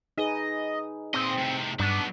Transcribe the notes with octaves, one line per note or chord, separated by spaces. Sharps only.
D#4 G#4 B4 D#5
A#2 C4 D#5
A2 C3
G2 F#3 B3 D4